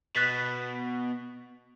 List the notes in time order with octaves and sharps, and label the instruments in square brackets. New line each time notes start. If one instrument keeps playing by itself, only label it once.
[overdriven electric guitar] B2 [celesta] F#6 A6 B6